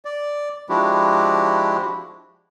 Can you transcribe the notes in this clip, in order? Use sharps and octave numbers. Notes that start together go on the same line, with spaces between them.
D5
F3 G#3 D4 E4 F#4 G4